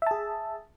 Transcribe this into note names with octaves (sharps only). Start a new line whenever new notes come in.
G#4 E5 A5